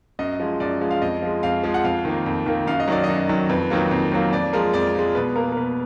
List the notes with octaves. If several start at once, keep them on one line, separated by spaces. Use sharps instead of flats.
F#2 D#5
F3 G#3
F#2 D5
F3 G#3
F5
F2 D#5
F3 G#3
F2 F5
F3 G#3
F#5
F2 F5
D#3 A#3
F2
D#3 A#3
F#2 F5
D#5
D#3 F#3 D5
F#2 D#5
D#3 F#3
F2 B4
D#3 F#3 A#3
F2
D#3 F#3 A#3
F2 D5
F3 G#3 A#4
F2 D5
F3 G#3
B2 B4
A#3 A#4
A#4
B2 B4